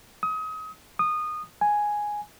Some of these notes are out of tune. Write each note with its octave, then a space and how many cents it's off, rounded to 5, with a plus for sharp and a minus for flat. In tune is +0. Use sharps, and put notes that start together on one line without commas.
D#6 +30
D#6 -20
G#5 +0